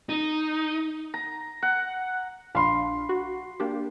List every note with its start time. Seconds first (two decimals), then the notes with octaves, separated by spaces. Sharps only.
0.09 D#4
1.14 A#5
1.62 F#5
2.55 A#1 D4 F5 B5 C6
3.09 F#4
3.60 A#3 D4 G4